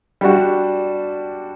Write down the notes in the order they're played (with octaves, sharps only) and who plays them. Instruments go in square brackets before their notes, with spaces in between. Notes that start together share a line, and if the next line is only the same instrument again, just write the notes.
[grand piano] G3 D4 F#4